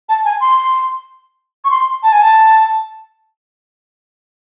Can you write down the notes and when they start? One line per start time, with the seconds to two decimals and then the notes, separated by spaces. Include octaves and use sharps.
0.09 A5
0.25 G#5
0.41 C6
1.65 C#6
1.71 C6
2.03 A5
2.12 G#5
2.21 A5